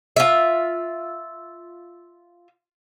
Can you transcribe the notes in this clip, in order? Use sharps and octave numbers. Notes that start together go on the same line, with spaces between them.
F4 E5